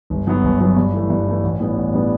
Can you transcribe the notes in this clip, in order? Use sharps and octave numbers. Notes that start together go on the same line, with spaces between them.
G1
F#2 F#3 B3
G1
F#2 F#3 B3
G2
E3 A3
G2
E3 A3
A1
A2 G3 B3 D4
A1
A2 G3 B3 D4